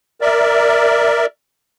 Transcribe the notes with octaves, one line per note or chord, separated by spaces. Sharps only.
A#4 D5 E5